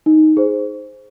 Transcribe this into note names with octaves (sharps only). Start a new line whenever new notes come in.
D#4
G#4 C5